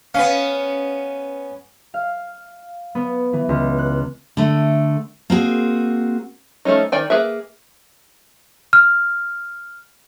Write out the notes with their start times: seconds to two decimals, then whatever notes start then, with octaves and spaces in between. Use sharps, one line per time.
0.14 B3 C#4 F5
1.94 F5
2.95 B3
3.33 E3
3.49 C#2
3.79 F#6
4.37 D3 A3
5.30 A#3 C4 F#4 G#4
6.65 F3 A3 A#3 C#4 D#4
6.92 D#3 D5 G5 G#5
7.10 A#3 G#4 B4 E5
8.73 F6